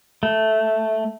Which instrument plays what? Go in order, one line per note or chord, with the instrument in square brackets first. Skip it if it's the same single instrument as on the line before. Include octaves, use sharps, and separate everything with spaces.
[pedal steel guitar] A3